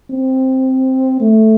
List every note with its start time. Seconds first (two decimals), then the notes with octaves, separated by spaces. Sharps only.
0.11 C4
1.21 A3